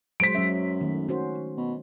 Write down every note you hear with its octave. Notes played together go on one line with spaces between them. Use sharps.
F#3 G#3 C5 B6 D7
F#2 F#3 E5
D#3 A3
C#4 F#4 C5
B2